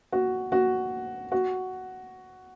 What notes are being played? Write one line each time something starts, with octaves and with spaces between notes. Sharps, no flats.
F#4
F#4
F#4